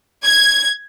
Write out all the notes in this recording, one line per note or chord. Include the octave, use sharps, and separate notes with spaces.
G#6